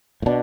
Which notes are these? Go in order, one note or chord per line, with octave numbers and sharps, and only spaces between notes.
A2
B2 D4